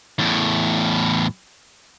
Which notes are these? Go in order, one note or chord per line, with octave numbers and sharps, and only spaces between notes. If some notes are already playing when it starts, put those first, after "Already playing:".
E2 A2